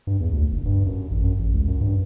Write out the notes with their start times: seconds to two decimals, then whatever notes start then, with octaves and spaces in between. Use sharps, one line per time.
0.07 G2
0.20 E2
0.33 D2
0.52 F#1
0.66 G2
0.86 F#2
1.11 A1
1.24 F#2
1.39 A1
1.54 C#2
1.68 F#2
1.81 G2